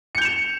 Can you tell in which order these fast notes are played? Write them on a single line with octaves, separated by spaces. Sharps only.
C#7 G6 F7 E7